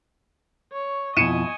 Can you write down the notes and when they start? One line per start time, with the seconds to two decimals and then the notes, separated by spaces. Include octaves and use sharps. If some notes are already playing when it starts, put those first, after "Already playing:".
0.73 C#5 C#6
1.17 F2 B2 E4 D#5 G#5 C#7 D#7 E7